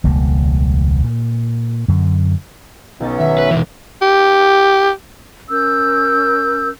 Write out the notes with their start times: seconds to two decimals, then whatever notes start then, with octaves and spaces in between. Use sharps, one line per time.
0.04 E1 C#2 G3 A#3
1.04 A#2
1.88 F#2 D3
3.00 B1 F#3 B3 C#4 D#4 A6
3.18 D#3 E5
3.38 B4
3.51 B2 E3
4.02 G4
5.50 C#4 A#4 E6 G6